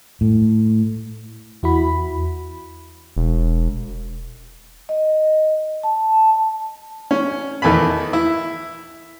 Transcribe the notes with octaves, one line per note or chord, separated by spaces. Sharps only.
A2
E2 E4 F#4 B5
E1
D#5
A5
C#4
E2 D#3 A4 G#5 B5
E4